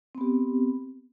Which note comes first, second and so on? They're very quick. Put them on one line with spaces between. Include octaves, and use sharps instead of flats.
C4 B3 G4